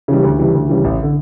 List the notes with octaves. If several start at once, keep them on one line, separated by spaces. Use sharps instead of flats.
C#3 E3 G3
D2
C#3 E3 G3
D2
C#3 E3 G3
A1
D3